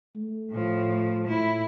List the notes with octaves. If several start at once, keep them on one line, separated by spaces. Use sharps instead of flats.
A3
A2 F3
A2 E4